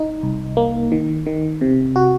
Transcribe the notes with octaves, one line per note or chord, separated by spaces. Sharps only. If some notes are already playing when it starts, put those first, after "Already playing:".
Already playing: D#4
C2
A#3
D#3
D#3
C3
F#4